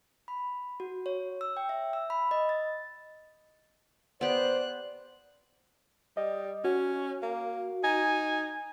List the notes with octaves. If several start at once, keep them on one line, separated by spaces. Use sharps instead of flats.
B5
F#4
C#5
E6
G5
E5
E6
B5
D#5
A6
B3 G4 C5 D5 F#6
G3 D#5
C#4 F#4
A#3
D#4 G#5